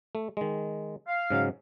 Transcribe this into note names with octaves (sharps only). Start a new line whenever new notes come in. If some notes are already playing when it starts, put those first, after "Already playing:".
A3
D#3 G#3
F5
G#2 C#3 F#3